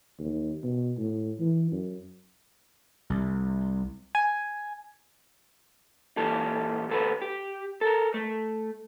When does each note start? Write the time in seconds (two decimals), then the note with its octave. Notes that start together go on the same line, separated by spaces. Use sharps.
0.19 D#2
0.63 B2
0.98 A2
1.39 E3
1.71 F#2
3.10 C2
4.15 G#5
6.17 A#2 E3 G4 A4
6.90 D2 A4 B4
7.22 G4
7.81 A4 A#4
8.14 A3